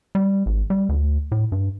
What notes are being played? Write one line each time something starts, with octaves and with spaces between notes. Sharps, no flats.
G3
G#1
G3
D2
A2
G2